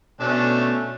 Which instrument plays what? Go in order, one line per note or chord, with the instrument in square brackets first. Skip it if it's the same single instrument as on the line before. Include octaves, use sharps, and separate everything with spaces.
[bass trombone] B2 [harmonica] A3 C#4 D4